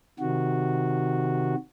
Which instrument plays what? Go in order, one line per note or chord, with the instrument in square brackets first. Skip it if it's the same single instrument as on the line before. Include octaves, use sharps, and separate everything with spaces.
[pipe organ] C3 D#3 F#4